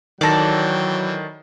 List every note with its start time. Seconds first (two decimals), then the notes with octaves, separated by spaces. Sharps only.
0.21 D#3 E3 F#3 A4 D5 G5 A#6